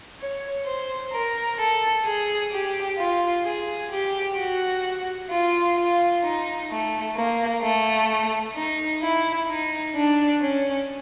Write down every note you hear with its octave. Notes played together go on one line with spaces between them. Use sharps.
C#5
C5
A#4
A4
G#4
G4
F4
G#4
G4
F#4
F4
F4
D#4
A3
A#3
A3
D#4
E4
D#4
D4
C#4